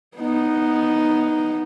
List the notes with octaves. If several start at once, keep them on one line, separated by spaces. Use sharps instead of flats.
B3 D#4